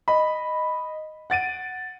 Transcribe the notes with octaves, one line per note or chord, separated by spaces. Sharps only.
D#5 B5
F#5 A6 D7 D#7